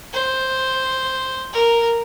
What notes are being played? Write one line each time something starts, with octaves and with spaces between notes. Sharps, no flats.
C5
A#4